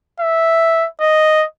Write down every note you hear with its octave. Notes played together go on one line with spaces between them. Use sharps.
E5
D#5